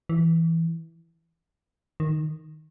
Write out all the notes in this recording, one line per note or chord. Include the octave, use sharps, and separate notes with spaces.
E3
D#3